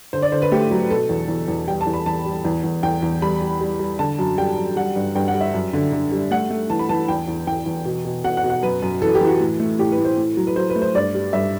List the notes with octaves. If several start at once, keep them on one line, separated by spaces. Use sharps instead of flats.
D3 C5
D5
D3 C5
B4
A3 G4
F#3
B2 A4
E2
E2
E2
G3 G5
A5
E2
B5
E2 A5
G3
E2
E2
E2 G5
E2
G3 B5
G3
G3
G3
D3 A5
F#2
G3 G5
F#2
G3 F#5
G2
G2 G5
F#5
G3
E5
F#2
D3
D3
G3
A3 F#5
A3
E3 A5
B5
E3 A5
E2 G5
E2
E2 G5
E2
B2
B2
B2 F#5
F#5
B2
F#5
F#2 B4
F#2
E3 A4
G4
E3
F#4
A2
A3
A2 G4
B4
A2
C5
A2
F#3
B4
F#3 C5
B4
A3
C5
G2 D5
G3
G2 E5